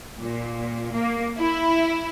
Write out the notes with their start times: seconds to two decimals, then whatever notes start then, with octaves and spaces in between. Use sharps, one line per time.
0.19 A#2
0.93 A#3
1.38 E4